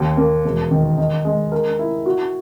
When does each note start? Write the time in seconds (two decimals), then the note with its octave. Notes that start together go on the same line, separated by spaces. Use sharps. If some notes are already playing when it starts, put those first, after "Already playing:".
Already playing: D#2
0.17 A#3
0.45 E1
0.71 D#3
0.98 D#4
1.25 G#3
1.52 A#4
1.79 E4
2.06 F#4